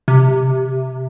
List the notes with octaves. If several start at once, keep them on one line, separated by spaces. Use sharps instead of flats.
C3